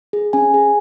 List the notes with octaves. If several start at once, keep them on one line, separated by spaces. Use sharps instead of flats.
G#4
C#4 G#5
G#4